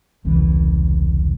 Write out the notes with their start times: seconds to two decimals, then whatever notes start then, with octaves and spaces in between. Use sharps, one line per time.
0.24 E1 C2 C#3 E3